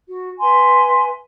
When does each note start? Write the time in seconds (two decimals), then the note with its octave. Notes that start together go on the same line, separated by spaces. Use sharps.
0.05 F#4
0.39 B4 E5 G#5 C6